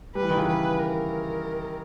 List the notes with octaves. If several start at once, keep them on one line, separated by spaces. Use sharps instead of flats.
G3 B4
E3
D#3
C#3 E3
B4
A#4